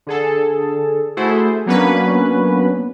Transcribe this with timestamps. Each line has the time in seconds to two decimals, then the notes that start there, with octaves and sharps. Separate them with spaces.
0.07 D3 G#4 A4
1.17 A3 E4 F#4 G#4 A4 C5
1.66 F#3 A#3 B3 C#4 D4 B4